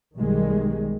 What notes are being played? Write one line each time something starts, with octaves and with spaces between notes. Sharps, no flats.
B1 D#3 G3 G#3